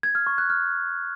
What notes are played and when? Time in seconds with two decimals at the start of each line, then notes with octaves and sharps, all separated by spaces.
0.03 G#6
0.15 F6
0.27 C#6
0.38 F#6
0.50 F6